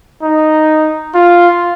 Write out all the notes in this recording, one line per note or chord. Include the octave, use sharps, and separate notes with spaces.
D#4
F4